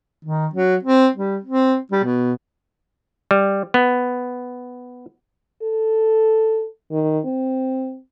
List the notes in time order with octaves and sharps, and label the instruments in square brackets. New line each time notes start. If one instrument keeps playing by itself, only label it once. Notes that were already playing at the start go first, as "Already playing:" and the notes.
[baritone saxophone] D#3
F#3
C4
G3
C4
G3
B2
[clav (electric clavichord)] G3
B3
[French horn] A4
D#3
C4